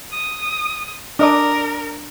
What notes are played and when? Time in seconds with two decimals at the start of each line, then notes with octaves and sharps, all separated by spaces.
0.12 D#6
1.19 D4 A#4 D#5 D6